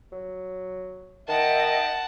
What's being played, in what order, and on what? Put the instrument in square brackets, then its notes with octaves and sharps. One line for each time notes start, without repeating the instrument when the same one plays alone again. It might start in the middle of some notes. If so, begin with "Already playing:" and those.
[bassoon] F#3
[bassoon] D#3 [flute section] D#5 E5 G5 [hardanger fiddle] F#5 A5